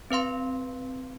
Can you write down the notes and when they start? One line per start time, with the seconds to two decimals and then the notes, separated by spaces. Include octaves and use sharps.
0.11 C4 B4 F5 C6